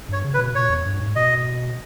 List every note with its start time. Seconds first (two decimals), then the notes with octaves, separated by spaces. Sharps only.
0.09 G2 C#5
0.24 C#3
0.34 B4
0.39 B2
0.55 A#2 C#5
0.70 E2
0.86 G2
1.00 G#2
1.16 B2 D#5